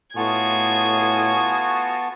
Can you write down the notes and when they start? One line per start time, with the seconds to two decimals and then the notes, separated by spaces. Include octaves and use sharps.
0.17 A2 B3 F4 F#4 G#4 A5 C#6 G#6